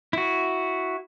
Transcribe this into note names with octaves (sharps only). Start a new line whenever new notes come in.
E4 F#4